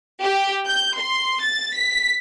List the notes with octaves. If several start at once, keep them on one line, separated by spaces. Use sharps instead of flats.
G4
G6
C6
A6
B6